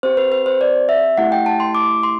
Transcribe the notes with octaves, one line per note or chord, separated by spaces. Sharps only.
C4 G4 C5
B4
B4
C5
D5
E5
A3 E4 G4 F#5
G5
A5
C6
D6
C6